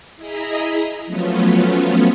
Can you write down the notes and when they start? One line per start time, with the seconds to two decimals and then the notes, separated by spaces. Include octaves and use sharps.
0.16 E4 G#4 D#5 A#5 B6
1.06 F3 F#3 A3 B3 C#4 F4